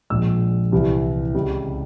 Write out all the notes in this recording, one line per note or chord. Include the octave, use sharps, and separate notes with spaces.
A#1 A#2 F3 G#3 E6
C2 C3 E3 G3
C#2 C3 G3